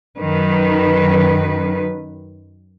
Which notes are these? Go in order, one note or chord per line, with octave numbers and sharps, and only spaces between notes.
F#2 D#3 B4